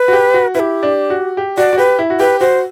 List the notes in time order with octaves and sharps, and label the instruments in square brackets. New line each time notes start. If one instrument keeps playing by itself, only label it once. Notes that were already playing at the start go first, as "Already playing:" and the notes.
Already playing: [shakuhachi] B4
[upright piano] F#4
G4
F#4
[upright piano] E4 [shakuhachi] G4 B4
[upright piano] D4
F#4
G4
[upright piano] F#4 [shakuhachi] D5
[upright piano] F#4
[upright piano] G4 [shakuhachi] B4
[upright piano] E4
F#4
[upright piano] G4 [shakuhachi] B4
[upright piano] F#4 [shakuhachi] C5